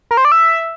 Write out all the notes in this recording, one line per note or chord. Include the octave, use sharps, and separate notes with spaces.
A#4
C5
D5
E5